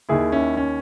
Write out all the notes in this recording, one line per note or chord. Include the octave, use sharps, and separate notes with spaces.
D#2 D#3 E4 G#4
C#4 E4
C#4